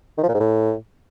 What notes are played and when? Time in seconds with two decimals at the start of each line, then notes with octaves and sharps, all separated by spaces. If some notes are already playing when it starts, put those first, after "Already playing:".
0.18 D#3
0.23 F3
0.29 A#2
0.34 G#2
0.40 A2